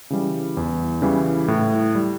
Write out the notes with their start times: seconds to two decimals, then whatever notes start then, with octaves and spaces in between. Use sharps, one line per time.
0.10 C#3 E3 G3
0.57 E2
1.02 C#3 E3 G3
1.48 A2
1.95 G3